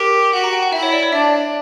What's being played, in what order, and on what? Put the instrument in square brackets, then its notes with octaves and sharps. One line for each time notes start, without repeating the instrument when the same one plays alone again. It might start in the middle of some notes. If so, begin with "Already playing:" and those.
Already playing: [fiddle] G4 [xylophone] A#4
[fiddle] F#4 [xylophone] F#5
[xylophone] A#5
G5
F#5
[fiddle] E4 [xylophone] E5
[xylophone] C#5
D5
C#5
[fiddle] D4 [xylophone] E5